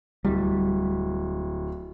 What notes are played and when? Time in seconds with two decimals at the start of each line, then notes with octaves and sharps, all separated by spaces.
0.25 D1 G3